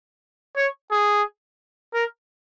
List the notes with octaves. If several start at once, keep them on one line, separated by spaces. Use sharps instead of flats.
C#5
G#4
A#4